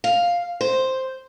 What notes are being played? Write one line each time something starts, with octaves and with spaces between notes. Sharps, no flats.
F5
C5